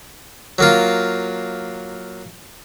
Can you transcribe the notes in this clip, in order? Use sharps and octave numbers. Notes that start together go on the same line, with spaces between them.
F#3 A#3 F4